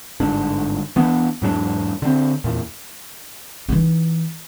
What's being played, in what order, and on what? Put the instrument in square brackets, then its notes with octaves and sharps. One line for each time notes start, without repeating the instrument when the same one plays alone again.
[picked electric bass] G1 G#2 D3 D4
E3 B3 D4
E2 G#2 F#3 D4
D3 C4
E2 A#2
[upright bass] E3 D#4